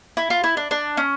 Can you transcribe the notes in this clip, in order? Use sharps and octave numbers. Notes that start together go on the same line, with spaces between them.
E4
F4
E4
D4
D4
C#4